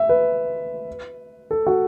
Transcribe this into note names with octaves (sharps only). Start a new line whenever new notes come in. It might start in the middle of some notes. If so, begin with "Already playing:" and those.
Already playing: E5
B4
A4
F#4